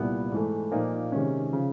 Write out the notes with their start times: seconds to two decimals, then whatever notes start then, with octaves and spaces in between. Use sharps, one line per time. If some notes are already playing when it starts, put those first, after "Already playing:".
Already playing: C2 A#2 G3 B3 E4
0.32 G#2 E3 A3
0.72 A#2 F3 A#3 D#4
1.12 C3 D#3 G#3 C#4
1.53 C#3 F3